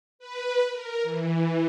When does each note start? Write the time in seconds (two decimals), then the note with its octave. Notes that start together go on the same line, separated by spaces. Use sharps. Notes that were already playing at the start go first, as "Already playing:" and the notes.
0.19 B4
0.72 A#4
1.03 E3